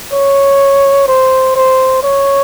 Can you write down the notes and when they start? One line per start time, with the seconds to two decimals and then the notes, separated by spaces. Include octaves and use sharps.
0.12 C#5
1.08 C5
1.56 C5
2.03 C#5